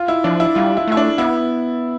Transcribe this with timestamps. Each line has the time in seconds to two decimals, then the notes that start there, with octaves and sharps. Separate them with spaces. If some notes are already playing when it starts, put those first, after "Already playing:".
Already playing: F4
0.08 E4
0.24 F3 D4
0.40 E4
0.55 G3 F4
0.77 E4
0.88 A3 E4
0.97 D4
1.18 B3 E4